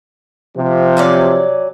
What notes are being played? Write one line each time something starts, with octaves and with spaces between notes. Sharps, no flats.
C3 F3
F#3 C#4 D5